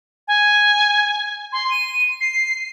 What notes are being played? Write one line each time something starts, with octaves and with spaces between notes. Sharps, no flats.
G#5
C6
D#7
C7